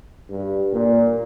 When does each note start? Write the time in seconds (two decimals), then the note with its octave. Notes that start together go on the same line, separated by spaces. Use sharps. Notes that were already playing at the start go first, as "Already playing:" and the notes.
0.30 G2
0.72 A#2